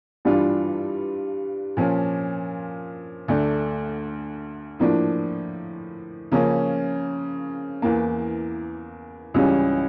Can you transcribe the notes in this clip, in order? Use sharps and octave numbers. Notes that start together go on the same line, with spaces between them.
G2 E3 G3 D4 F4
A#2 F3 C#4
D2 D3 A3 D4
A2 F3 A#3 D4
C#3 F3 A#3 C#4
E2 E3 A#3
C#2 C#3 E3 G3 C#4